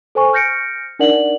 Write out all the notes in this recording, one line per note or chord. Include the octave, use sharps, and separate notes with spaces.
A4 C5 G#5 C#6
F6 G6 A#6 C#7 D7
D4 D#4 A#4 D5 F#5 F#7